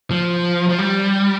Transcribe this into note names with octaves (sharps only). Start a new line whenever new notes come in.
F3
F3
G3